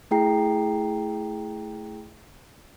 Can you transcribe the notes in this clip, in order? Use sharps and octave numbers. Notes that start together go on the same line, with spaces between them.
A3 E4 G#4 G5 A#5 C7